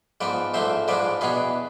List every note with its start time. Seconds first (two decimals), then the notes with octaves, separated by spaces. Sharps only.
0.21 G#2 F3 B3 B4 D5
0.54 G#2 F3 A3 D4 C5 E5
0.88 G#2 F3 G#3 D4 B4 D5
1.21 E2 B2 B3 D4 G#4 B4